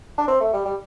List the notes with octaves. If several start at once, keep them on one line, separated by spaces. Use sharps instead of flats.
D4
C4
A3
G3
G3